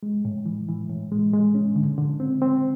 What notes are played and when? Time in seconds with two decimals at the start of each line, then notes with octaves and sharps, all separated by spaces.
0.03 G#3
0.25 A2
0.46 E3
0.68 E3
0.90 A2
1.12 G#3
1.34 G#3
1.55 C#4
1.76 D3
1.98 D3
2.20 C4
2.42 C4